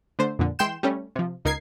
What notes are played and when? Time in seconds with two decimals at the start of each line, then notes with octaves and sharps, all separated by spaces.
0.19 D3 A3 C5
0.39 F2 A#2 D3
0.59 E3 G#3 G5 C6 G6 E7
0.83 G3 A3 C#4
1.16 C3 F3
1.45 C#2 D#4 A#4 G#6 C7